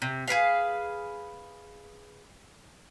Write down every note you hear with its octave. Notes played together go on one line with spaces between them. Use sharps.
C3
G#4 A#4 B4 F5